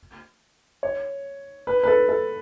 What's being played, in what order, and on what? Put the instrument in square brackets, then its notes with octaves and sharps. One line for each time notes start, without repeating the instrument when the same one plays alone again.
[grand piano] C#5
B4
B4
A4
A4